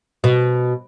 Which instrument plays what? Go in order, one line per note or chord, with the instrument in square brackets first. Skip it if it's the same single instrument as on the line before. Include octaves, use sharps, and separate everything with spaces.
[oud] B2